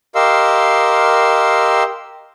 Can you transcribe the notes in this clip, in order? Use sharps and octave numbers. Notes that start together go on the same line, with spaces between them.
G4 A#4 D#5 F5 C6 E6